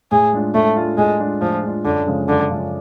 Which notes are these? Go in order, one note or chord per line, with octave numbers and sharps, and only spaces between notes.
A2 G#4
G#3 D4 F4
A2 A3
G#3 D4 F4
A2 G#3
G#3 D4 F4
A2 F3
G#3 D4 F4
F#2 D3
C#3 F3 G#3 C#4
F#2 D3
C#3 F3 G#3 C#4